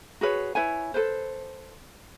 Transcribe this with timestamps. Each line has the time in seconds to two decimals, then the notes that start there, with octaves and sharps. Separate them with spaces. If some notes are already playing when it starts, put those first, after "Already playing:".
0.21 F#4 G#4 B4 C#5
0.55 E4 B4 C#5 G#5
0.94 A4 B4 C5